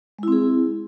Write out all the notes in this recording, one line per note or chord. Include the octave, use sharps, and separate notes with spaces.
G#3 C4 E4 G#4